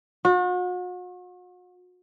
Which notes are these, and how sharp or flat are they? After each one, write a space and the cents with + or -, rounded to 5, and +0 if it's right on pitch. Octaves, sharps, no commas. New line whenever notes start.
F#4 -40